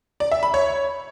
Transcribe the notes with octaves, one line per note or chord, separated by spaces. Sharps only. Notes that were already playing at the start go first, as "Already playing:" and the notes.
D5
E5
B5
C#5